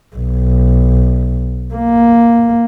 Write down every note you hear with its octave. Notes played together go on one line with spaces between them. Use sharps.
B1
A#3